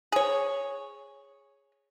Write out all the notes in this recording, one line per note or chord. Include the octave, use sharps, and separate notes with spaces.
G#4 C#5